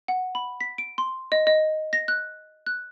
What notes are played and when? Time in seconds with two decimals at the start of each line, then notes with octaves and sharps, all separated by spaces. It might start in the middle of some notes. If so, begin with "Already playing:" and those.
0.08 F#5
0.35 B5
0.61 B6
0.78 D7
0.98 C6
1.32 D#5
1.47 D#5
1.93 A#6
2.08 F#6
2.66 F#6